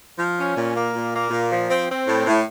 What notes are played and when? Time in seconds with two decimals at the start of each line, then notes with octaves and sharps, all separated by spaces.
0.17 F3
0.36 C#4
0.55 A#2
0.74 A#3
0.94 A#2
1.12 A#3
1.31 A#2
1.50 F3
1.68 C4
1.88 C4
2.06 A2
2.26 A2